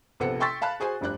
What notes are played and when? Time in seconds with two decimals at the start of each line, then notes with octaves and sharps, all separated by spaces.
0.20 A#1 C3 B3 A4 F#5 C#7
0.40 G5 C6 C#6 E6 A6 B6
0.62 F5 A5 B5 F#6
0.80 F#4 G#4 C5 G#5
1.01 F1 G2 D4 F#6